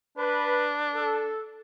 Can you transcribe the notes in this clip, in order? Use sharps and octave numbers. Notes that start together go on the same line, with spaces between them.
D4 B4
A4